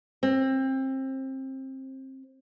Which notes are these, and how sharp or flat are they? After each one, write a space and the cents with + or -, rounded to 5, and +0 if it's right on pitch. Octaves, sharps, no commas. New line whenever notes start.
C4 +25